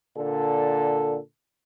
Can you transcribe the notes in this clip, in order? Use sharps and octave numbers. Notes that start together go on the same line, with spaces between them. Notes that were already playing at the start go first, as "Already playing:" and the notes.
A#2 D3 A4